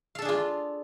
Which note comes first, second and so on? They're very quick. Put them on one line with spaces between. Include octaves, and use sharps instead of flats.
F5 A4 D4 G#4 F4